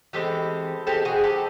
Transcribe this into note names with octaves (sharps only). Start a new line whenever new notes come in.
E3 G#3 C4 G4 A4
E3 G#3 C4 G4 A4
F#4 G#4
G4 A4